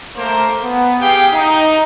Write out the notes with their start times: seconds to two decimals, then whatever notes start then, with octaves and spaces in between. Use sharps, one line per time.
0.16 A3 A#3 A#4 C5
0.64 B3
1.00 G4 G#4 F5 G5
1.33 D#4